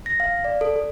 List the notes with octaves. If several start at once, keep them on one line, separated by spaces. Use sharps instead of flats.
A#6
F5
D5
A4
A4